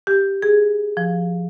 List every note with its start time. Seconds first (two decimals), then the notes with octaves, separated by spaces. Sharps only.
0.07 G4
0.42 G#4
0.97 F3